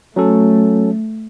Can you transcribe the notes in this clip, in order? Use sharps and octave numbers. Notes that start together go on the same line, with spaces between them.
F#3 A3 C#4 A4